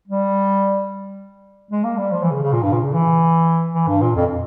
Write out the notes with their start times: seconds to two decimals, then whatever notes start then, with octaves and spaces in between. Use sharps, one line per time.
0.08 G3
1.71 G#3
1.84 A#3
1.97 G3
2.12 F3
2.22 E3
2.31 C#3
2.42 C#3
2.53 A#2
2.63 G2
2.73 A#2
2.83 C#3
2.93 E3
3.74 E3
3.87 G2
4.02 A#2
4.15 F2